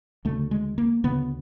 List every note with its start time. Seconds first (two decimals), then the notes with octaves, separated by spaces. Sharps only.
0.25 D2 C#3 A3
0.51 G#3
0.78 A#3
1.04 D2 C#3 B3